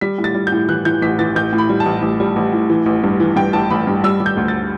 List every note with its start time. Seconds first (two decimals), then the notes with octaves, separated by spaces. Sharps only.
0.01 G3 B6
0.18 A2
0.24 A6
0.35 G3
0.47 G6
0.52 A2
0.69 E3 F#6
0.85 E3 G6
1.02 A1 B6
1.19 E3 A6
1.35 A1 G6
1.53 A2
1.58 B5
1.69 G3
1.80 A5
1.86 A1
2.02 A1
2.20 G3
2.36 A1
2.53 A2
2.70 E3
2.86 A1
3.04 G2
3.20 E3
3.36 G2 G5
3.53 A1 A5
3.70 A1 B5
3.87 G2
4.04 G3 E6
4.20 G3
4.26 G6
4.37 D2
4.48 A6